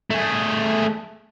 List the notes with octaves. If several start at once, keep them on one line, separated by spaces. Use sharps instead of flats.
A3 G#4